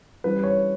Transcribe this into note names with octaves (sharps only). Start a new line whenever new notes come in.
E3 G3 C#4 B4
C#5